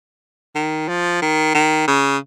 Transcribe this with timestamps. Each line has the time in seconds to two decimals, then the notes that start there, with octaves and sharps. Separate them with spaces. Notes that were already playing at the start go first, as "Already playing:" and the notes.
0.55 D#3
0.88 F3
1.22 D#3
1.54 D#3
1.88 C#3